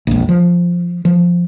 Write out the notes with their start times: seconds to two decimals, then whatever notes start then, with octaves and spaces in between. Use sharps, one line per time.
0.07 E1 A#1
0.29 F3
1.05 F3